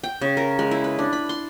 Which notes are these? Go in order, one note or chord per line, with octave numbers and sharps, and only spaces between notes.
G5
C#3
A#4
G#3
E4
B4
D4
B5
C6